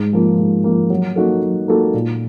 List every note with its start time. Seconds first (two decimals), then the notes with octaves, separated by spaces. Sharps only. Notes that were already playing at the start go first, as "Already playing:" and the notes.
Already playing: G#2
0.13 F3 A#3
0.39 G#2
0.64 F3 A#3
0.90 F#3
1.16 A#3 D#4 F#4 A4
1.42 F#3
1.68 A#3 D#4 F#4 A4
1.94 A#2